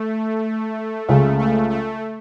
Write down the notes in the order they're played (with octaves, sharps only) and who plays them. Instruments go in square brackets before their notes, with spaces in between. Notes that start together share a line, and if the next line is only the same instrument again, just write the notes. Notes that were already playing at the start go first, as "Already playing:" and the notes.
Already playing: [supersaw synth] A3
[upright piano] C#2 C#3 G#3 [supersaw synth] A3
[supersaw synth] A3
A3